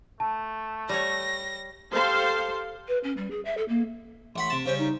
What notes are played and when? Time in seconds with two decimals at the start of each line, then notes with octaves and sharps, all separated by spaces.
0.20 A3 A5
0.89 G3 C#5 A#6
1.93 G4 A4 C5 F5 C6
2.88 B4
3.03 C#4
3.17 G3
3.30 G#4
3.45 E5
3.57 A4
3.68 A#3
4.36 A1 F#5 B5 C6
4.50 C3 A5
4.66 C#3 G3 C#4 C5
4.79 D#4